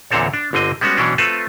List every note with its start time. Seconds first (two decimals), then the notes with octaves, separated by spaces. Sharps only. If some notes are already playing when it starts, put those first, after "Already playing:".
0.10 E2 A#2 D3 C4 A4 C#5
0.34 D4
0.53 G1 D3 C4 D#5
0.81 G3 G#3 B3 C#4 F#4
0.97 B2 E3 F#3 C#4 D4
1.18 A3 C4 F4 A4 B4